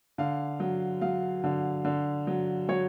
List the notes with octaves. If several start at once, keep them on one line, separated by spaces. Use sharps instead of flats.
D3 F5
F#3
F#3 F5
D3
D3
F#3
F#3 C#5